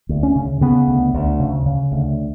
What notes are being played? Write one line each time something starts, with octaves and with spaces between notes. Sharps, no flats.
D2
C#4
C#3
C#3 B3
D2
D2
C#3
C#3
D2